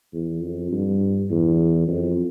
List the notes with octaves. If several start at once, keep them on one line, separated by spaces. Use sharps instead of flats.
E2
F2
G2
E2
F2